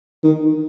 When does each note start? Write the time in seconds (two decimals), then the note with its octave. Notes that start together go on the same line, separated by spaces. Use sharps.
0.24 D#3